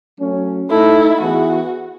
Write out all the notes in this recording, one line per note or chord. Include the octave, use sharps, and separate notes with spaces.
F#3 A3 C#4
A3 D#4 E4 A4
E3 B3 E4 F#4 G#4 B4